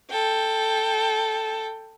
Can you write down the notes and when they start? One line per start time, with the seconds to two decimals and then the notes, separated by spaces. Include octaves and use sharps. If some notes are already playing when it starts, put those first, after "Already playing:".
0.10 A4 G5